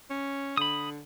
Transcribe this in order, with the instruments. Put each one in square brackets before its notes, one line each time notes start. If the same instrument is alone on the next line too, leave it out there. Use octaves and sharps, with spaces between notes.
[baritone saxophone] C#4
[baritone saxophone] D3 [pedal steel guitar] B5 D#6